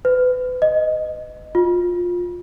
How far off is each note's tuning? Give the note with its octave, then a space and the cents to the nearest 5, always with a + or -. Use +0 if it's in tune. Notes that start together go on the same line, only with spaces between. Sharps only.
B4 +35
D#5 -5
F4 +20